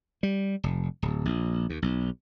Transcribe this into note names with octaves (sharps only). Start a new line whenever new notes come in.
G3
F1
D1
A#1
D#2
B1